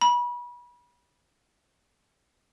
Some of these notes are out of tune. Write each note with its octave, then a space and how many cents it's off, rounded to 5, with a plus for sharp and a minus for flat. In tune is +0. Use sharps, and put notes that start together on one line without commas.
B5 -30